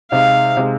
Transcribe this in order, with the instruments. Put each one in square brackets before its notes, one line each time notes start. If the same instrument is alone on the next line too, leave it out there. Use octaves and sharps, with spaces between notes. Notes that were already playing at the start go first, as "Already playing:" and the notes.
[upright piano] C3 G#3 D#4 [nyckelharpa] F5
[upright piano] C3 G#3 D#4